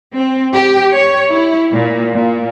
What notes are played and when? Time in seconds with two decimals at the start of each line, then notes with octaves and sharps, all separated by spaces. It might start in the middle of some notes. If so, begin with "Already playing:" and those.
0.14 C4
0.54 G4
0.93 C#5
1.29 E4
1.71 A#2
2.13 A#2